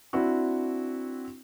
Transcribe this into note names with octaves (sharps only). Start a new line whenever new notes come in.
C4 D4 E4 F#4